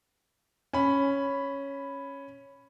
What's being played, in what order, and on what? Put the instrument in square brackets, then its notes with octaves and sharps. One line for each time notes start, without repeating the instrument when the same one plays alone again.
[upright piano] C#4 B5